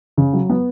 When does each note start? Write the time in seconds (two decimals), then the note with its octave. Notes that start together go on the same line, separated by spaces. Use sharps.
0.18 C#3
0.33 F#3
0.50 B3